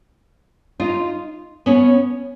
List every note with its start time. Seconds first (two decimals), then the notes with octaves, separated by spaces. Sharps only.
0.80 D#4 F4
1.66 B3 C#4